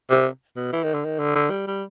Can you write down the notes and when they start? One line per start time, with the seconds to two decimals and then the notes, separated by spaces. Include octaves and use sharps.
0.10 C3
0.56 B2
0.72 E3
0.83 D#3
0.94 D3
1.05 D#3
1.19 D3
1.35 D3
1.50 G3
1.67 G3